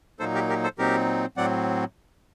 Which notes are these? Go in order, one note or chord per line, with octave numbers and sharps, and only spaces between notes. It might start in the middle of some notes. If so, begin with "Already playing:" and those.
A#2 F#3 A#3 D#4 A4 C5
G4 A#4
G4 A#4
A4 C5
A#2 F#3 C4 D#4 G4 A#4
A2 F#3 C4 D5 F#5